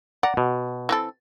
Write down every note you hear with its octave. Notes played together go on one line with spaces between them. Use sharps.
D5 F#5 A#5
B2
E3 C4 A4